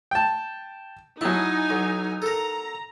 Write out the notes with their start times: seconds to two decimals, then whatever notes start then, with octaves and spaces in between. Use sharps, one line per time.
0.11 G5 A5
1.21 F#3 D#4 E4 G#5 A5
1.70 B1
2.22 A4 A#4 A#5